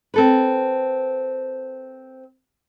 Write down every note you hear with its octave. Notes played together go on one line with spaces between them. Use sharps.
C4 A4 B4